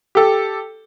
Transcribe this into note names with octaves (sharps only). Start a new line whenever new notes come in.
G4 A4